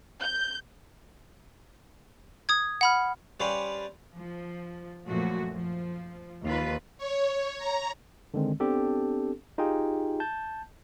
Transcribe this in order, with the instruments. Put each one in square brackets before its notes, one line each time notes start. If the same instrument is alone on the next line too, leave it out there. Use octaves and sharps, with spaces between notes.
[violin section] G6
[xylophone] D#6 G#6
F#5 B5 F6
[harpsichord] G3 C#4 B4 C5 D5 F5
[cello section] F3
F#2 A#2 F3 A3 F#4
F3
D#2 F4 B4
[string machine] C#5
A#5
[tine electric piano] D3 D#3 G#3 C4
B3 C4 D4 G4 A4
D#4 F4 G4 G#4 G5
A5 G6